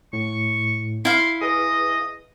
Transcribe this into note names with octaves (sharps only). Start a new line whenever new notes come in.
A2 C#6
E4 F5 C6
G#4 B4 D#5